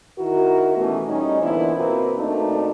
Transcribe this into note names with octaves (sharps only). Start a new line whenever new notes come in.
D#3 E4 F#4 A#4
B2 E3 A3 B3 C#4 G4
A2 G3 C#4 D#4
A#2 D3 E3 B3 E4 C5
B2 A#3 C4 B4
B2 A3 A#3 C4 D4 D#4